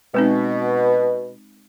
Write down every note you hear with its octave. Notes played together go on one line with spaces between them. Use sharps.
B2 G#3 C4 D#4